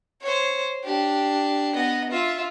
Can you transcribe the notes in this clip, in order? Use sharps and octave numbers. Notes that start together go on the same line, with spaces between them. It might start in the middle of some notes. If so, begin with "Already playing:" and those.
C5 C#5
D4 G4
B3 D#5
F4 E5